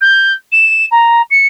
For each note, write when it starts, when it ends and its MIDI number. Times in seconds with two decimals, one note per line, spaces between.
0.01 0.33 91
0.52 0.86 100
0.91 1.22 82
1.30 1.47 97